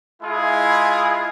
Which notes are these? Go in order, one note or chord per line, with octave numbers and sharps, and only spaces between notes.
G#3 E4 F4 G#4